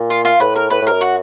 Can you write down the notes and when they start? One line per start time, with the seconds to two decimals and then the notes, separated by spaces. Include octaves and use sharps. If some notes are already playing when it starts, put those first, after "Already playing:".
Already playing: A#2
0.10 F4
0.25 F4
0.40 A2 B4
0.56 A#4
0.70 A2 B4
0.81 A2
0.87 F#2 A#4
1.01 F#4